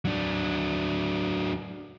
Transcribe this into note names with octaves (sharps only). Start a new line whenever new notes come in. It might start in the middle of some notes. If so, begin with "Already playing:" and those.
F#3 D4